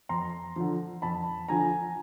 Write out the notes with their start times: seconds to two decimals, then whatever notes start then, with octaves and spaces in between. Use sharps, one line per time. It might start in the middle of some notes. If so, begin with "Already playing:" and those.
0.09 F2 A#5 C6
0.56 D3 F3
1.02 F2 A5 B5
1.49 D3 F3 G#5 A#5